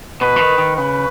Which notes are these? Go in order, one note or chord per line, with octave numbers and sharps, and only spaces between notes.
B2 B4
E3
D#3
D#3
C#3 B4